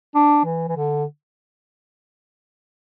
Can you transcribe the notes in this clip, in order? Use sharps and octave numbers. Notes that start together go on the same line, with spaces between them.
D4
E3
E3
D3